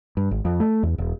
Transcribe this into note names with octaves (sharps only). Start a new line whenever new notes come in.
G2
G#1
F2
A3
E2
E1